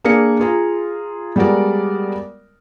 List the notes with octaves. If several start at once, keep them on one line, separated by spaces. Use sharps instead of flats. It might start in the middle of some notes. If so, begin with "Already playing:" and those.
A#3 D4 G#4 A#4 C#7
F4 G#4 A#5
G3 G#3 B3 F#4 A#4 D5